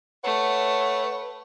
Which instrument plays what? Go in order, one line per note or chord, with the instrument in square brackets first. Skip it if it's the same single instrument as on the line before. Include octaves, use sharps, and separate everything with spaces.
[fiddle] A3 [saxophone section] B4 C#5 F#5